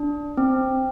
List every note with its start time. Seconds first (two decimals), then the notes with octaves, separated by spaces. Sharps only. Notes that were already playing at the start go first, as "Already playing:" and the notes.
Already playing: D4
0.37 C4